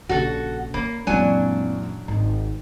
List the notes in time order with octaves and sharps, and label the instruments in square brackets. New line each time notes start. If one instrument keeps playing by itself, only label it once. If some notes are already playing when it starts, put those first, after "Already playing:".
[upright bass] A#1 C#3 [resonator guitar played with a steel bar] F#4 A4
[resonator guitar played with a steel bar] A#3 [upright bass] C#4 [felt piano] B5
[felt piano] F#2 A#2 E3 [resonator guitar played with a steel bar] F#3 D4 G#5 [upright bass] G#3 C4
[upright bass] G#1 [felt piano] D#4